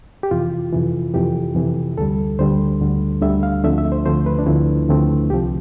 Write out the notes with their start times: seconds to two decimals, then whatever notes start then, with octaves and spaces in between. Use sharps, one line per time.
0.23 G4
0.31 F2 C3 E3 F4
0.72 F2 C3 E3
1.14 F2 C3 E3 G4
1.55 F2 C3 E3
1.98 D2 D3 G3 A4
2.39 D2 D3 G3 C5
2.80 D2 D3 G3
3.21 D2 D3 G3 E5
3.43 F5
3.64 D2 D3 F3 A3 C4 E5
3.78 E5
3.92 C5
4.06 D2 D3 F3 A3 C4 C5
4.26 B4
4.39 D4
4.46 D2 D3 F3 A3 C4 E4
4.89 D2 D3 F3 A3 C4
5.30 C2 C3 F3 G4